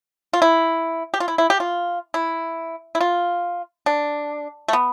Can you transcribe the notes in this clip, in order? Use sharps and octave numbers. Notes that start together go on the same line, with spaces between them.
F4
E4
G4
F4
E4
E4
G4
F4
E4
E4
F4
D4
A3
B3